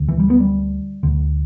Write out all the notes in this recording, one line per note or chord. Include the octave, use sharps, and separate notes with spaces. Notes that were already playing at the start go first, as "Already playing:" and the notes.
Already playing: D2 D3
E3
G3
B3
G3
D2 D3